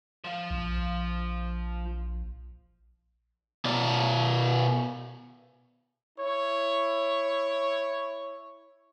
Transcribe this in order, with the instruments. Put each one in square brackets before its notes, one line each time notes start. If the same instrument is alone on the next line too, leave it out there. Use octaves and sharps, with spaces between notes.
[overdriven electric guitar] F3 F4
[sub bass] A#1
[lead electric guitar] B2 D5
[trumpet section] E4 C#5